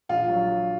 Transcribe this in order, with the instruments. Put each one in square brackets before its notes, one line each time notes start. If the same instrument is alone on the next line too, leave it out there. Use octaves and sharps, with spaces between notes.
[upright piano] A#1 [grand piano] F4
[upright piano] F#3